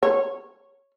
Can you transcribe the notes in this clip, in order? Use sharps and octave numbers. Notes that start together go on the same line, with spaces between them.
C#5